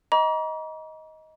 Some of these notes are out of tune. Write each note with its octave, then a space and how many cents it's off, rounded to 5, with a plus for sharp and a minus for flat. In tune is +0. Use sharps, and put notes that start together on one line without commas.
D#5 +15 A#5 +35 D6 -40